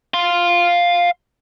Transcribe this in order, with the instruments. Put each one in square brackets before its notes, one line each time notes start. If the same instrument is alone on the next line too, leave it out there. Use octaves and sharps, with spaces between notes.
[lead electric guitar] F5 C6